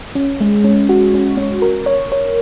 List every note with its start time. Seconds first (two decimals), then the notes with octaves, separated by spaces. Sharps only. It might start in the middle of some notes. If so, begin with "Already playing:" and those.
0.15 C#4
0.41 G#3
0.64 C#4
0.89 F#4
1.14 C#4
1.37 C#4
1.62 A#4
1.86 C#5
2.12 C#5